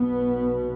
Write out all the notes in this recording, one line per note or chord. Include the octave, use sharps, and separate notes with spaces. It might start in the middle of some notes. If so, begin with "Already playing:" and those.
Already playing: B1 B2 B3